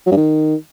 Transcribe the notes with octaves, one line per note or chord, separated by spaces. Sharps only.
F#3
G2
D#3